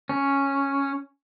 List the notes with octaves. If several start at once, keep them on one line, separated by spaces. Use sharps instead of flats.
C#4